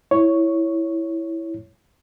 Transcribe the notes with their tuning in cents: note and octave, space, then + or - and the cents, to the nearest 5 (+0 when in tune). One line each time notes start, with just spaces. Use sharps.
E4 +0 C#5 +0